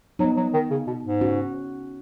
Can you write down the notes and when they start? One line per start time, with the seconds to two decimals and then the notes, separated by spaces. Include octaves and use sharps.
0.19 F#3 B3 D#4
0.37 F#3
0.53 D#3
0.71 C#3
0.87 B2
1.04 G#2
1.21 C#4 F#4